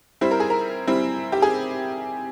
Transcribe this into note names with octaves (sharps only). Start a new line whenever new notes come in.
G3 C4 E4 C5
A#4
G#4
A#4
G3 C4 E4
G4
G#4